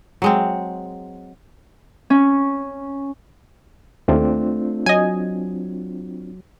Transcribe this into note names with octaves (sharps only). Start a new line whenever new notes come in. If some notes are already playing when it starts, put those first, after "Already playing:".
F#3 G#3 C4
C#4
D#2 A3 C4 D4 F4
F#3 D#5 G#5